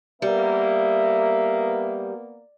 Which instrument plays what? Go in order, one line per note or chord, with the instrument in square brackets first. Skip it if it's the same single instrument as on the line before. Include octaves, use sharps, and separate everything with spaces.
[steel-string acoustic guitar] G3 [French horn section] A#3 B3 [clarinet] E5